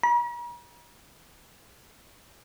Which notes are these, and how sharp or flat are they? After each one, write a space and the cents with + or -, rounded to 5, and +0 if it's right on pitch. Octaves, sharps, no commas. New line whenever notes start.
A#5 +45